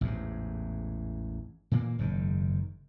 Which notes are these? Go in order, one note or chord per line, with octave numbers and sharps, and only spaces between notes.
A1 E2 G#2
A#2 E3 A3 A#3
F#1 G#2 D#3